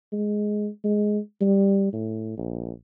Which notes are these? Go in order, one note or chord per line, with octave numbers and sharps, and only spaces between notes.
G#3
G#3
G3
A2
A#1